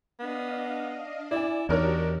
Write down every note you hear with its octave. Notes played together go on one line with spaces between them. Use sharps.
B3 D4 D#5 F5
E4 D5 G#5
E2 D4 D#4 F#4 G4 A#4 C#5